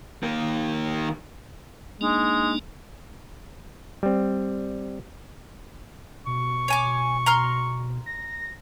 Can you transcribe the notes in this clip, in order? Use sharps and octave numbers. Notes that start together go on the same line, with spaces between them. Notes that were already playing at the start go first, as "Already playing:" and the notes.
D#3 A#3
G#3 A#3 D4 D#4
G3 C4
B2 C#6
C#5 G#5 D6
A#5 C6 F6
A#6